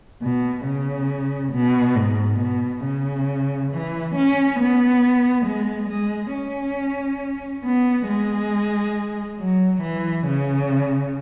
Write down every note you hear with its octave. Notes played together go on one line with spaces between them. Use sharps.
B2
C#3
B2
G#2
B2
C#3
E3
C#4
B3
G#3
G#3
C#4
B3
G#3
F#3
E3
C#3